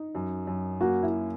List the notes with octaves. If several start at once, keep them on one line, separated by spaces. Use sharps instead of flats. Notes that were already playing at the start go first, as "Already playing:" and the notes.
Already playing: D#4
F#2
F#2
A#3 F#4
E4